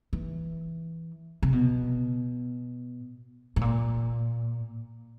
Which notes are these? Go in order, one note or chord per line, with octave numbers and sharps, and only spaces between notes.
E3
C3
B2
A2
A#2